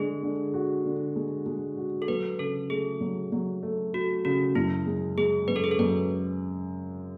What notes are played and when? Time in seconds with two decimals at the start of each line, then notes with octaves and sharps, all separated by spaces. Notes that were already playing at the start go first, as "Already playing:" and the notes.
Already playing: D3 G#3 G#4
0.23 D3
0.54 F#4
0.85 D3
1.16 G#3
1.46 G#3
1.77 F#4
2.02 A4
2.08 F#3 B4
2.39 C#3 A4
2.70 A3 G#4
3.01 F#3
3.32 F#3
3.63 A3
3.94 A3 F#4
4.25 C#3 F#4
4.55 F#2 E4
4.87 G#3
5.17 G#3 G#4
5.48 F#2 B4
5.56 A4
5.64 G#4
5.71 A4
5.79 F#2 B4